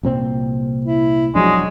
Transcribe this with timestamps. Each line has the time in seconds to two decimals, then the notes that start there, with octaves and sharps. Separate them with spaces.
0.03 C2 A#2 C4
0.84 E4
1.35 E1 F3 F#3 G#3 D4